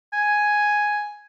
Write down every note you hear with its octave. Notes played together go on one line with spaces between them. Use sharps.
G#5